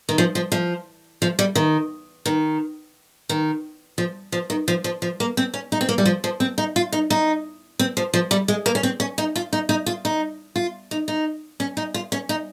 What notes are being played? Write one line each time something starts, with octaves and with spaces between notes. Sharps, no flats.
D#3
F3
F3
F3
F3
G3
D#3
D#3
D#3
F3
F3
D#3
F3
F3
F3
A#3
C4
C#4
D#4
C4
A#3
G3
F3
F3
C4
D#4
F4
D#4
D#4
C4
F3
F3
G3
G#3
A#3
C#4
C4
C#4
D#4
F4
D#4
D#4
F4
D#4
F4
D#4
D#4
C#4
D#4
F4
C#4
D#4